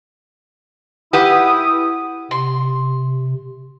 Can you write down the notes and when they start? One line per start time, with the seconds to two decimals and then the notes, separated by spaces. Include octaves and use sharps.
1.13 E4 G4 B4 F#5 D#6
2.31 C3 C6